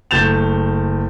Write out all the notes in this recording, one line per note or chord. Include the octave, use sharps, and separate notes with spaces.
F#1 A3 G6 A6 E7 F7